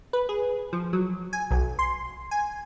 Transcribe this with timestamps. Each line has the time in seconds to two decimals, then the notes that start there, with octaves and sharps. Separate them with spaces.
0.13 B4
0.29 G#4
0.73 F3
0.93 F#3
1.33 G#5
1.51 B1
1.79 C6
2.31 G#5